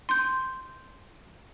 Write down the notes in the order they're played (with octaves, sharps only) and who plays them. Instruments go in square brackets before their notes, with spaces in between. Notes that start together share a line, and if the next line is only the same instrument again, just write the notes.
[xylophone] C6 G6